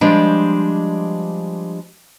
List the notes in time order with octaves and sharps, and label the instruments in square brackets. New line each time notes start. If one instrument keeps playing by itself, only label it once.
[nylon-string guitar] F3 G3 G#3 D4